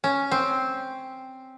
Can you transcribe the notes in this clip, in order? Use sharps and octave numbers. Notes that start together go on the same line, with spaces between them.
C#4
C4